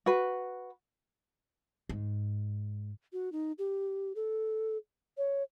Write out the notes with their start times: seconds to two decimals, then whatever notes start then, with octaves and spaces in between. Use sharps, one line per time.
0.06 F#4 B4
1.89 G#2
3.13 F#4
3.32 D#4
3.58 G4
4.16 A4
5.18 C#5